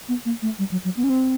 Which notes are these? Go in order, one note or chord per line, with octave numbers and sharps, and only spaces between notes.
B3
A#3
A3
G3
F#3
F#3
B3
C#4
C4